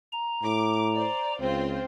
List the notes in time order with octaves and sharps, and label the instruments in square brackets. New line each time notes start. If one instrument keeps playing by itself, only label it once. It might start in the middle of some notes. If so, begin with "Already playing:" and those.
[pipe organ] A#5
[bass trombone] A2 [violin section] D6
[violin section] C5 D5
[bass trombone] C#2 [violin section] C4 F4 C5